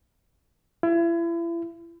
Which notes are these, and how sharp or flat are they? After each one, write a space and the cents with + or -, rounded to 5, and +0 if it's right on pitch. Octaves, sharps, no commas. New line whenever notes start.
E4 +35